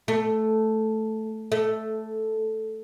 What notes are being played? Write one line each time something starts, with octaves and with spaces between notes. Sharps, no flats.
A3
A3